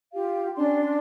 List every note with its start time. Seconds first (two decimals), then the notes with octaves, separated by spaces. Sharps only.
0.11 F4 G4 F5
0.56 C#4 D4 D5 C6